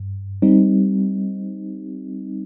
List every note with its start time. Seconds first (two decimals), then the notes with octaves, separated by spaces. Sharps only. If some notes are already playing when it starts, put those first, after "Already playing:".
Already playing: G2
0.42 G3 C4 D#4